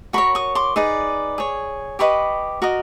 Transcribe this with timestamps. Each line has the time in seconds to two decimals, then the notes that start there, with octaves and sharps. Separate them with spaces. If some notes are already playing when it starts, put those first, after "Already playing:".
0.13 F#4 A#4 C#5 B5 C#6
0.35 C#6 D#6
0.55 C6 D6
0.76 D#4 G#4 B4 D5
1.38 G#4 C#5
1.99 G4 B4 D#5 B5 C#6
2.62 F#4 A#4 D#5